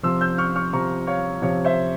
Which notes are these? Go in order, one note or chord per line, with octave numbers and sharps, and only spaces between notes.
C3 F3 C6 E6
E6 G6
C#6 F6
C#6 F6
C3 F3 A#5 C#6
C#5 F5
C3 F3 C#5 F5
C5 E5